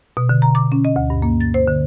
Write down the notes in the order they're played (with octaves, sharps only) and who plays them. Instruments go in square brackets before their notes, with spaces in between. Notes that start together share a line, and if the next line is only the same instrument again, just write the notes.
[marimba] B2
D3
A#5
D6
C#4
D#5
D2
G2
A#3
A6
C5
D3